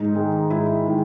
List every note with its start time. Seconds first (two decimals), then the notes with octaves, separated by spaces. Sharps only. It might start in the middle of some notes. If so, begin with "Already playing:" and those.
Already playing: G#2 D#4
0.15 D#3 G#3
0.50 G#2 E4
0.86 D#3 G#3